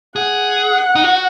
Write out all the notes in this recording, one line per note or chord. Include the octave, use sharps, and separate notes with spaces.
G#4 F#5
D#4
F#4